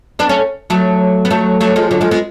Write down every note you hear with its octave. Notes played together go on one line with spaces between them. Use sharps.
B3 D4
A3 C#4
F#3 A3
B3
F#3 A3
F#3 A3
F3 G#3
D3 F#3
F3 G#3
G#3 B3